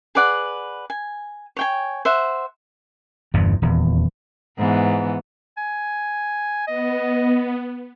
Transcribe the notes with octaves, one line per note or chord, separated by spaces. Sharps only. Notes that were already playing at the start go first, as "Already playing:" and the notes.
G#4 B4 D5 F#5
G#5
C#5 G5 G#5
C5 E5 F#5
G1 E2 G2 C3
D#1 E2
G#2 E3 B3
G#5
B3 D#5